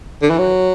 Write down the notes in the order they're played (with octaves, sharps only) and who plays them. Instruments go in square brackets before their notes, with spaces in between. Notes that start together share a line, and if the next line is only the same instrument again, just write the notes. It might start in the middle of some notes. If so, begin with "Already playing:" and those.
[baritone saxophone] D3
E3
F#3